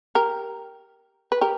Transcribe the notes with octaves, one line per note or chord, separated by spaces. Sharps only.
G4 A#4
B4
G4 A#4